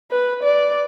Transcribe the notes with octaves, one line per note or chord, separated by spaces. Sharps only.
B4
D5